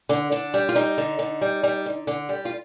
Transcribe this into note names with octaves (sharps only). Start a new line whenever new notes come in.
D3
D3 D4
G3
F4
G3 D#4
D3
D3
G3
G3
D3
D3
G3
F4